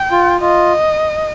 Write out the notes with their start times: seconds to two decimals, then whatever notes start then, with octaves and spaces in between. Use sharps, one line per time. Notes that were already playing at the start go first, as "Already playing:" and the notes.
Already playing: G5
0.11 F4
0.40 F4 D#5